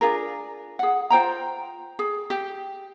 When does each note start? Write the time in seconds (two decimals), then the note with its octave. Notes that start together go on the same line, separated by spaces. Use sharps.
0.01 D4 F4 G#4 A#4
0.79 G#4 F#5
1.10 F4 C5 G5 A#5
1.99 G#4
2.30 G4